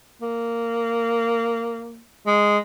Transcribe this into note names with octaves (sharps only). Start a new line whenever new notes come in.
A#3
G#3